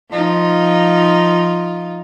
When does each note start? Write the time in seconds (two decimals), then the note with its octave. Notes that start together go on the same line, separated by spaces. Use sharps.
0.11 F3 D#4 F4